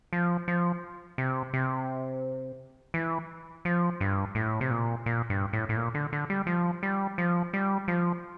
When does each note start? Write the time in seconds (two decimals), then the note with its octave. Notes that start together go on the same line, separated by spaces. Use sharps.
0.13 F3
0.48 F3
1.18 C3
1.54 C3
2.94 E3
3.65 F3
4.00 G2
4.35 A2
4.61 C3
4.71 A#2
5.06 A#2
5.30 G2
5.53 A2
5.69 A2
5.77 A#2
5.94 D3
6.13 D3
6.30 G3
6.47 F3
6.83 G3
7.18 F3
7.53 G3
7.88 F3